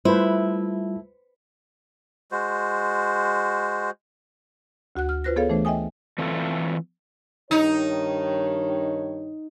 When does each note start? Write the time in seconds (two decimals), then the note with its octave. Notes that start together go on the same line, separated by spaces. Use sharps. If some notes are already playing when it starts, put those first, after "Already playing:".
0.05 G3 A3 E4 F4 B4 C5
2.32 G#3 F#4 C5
4.96 D2 F#4 F#5 F#6
5.09 F6
5.24 F4 B4 C5 F#6 A#6
5.36 B3 G#4 A4 C#5 F5
5.50 E3 A3 D4 C5
5.65 D#5 E5 G5 G#5 D#6
6.18 E3 A3 C4 F4 A4
7.51 G2 D#3 D#4 C#5